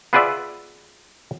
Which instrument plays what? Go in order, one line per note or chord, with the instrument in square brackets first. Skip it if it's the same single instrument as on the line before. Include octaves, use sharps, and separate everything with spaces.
[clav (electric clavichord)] B3 F4 G#4 B4 D5 E5